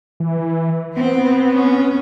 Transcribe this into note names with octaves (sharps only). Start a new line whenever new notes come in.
E3
B3 C4
C#4